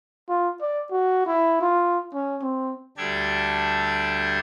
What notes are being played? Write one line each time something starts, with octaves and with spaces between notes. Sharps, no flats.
F4
D5
F#4
E4
F4
C#4
C4
D2 G3 D4 G4 A4 G#6